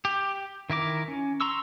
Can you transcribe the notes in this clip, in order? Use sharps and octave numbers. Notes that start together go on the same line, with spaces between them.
G4
D#3 E4 A#4 D6
C#4
A#5 C6 C#6 E6